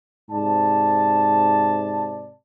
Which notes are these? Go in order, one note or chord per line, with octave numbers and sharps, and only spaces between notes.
G#2 C3 D5 A5